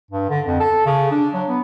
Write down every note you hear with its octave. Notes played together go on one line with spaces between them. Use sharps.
G2
D3
F2
A4
C#3
D4
F#3
B3